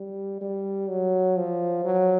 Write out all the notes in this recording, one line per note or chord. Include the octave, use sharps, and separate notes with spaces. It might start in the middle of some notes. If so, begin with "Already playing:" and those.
Already playing: G3
G3
F#3
F3
F#3